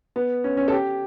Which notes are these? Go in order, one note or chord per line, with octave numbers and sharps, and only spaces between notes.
B3
C#4
C#4
A4
G4